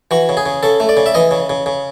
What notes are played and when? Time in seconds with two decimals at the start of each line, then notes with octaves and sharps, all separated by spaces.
0.11 E3 F#4
0.29 C#3
0.37 G#4
0.46 C#3
0.63 C#3 A4
0.80 A3
0.89 D5
0.97 C#3
1.06 E5
1.14 E3 D#5
1.31 C#3
1.50 C#3
1.66 C#3